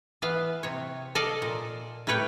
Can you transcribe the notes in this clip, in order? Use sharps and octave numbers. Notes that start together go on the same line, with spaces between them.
E3 B3 B4 F5
C3 C#5
A4 D5 D#5 F5
A#2
A2 G3 B4 C#5 G5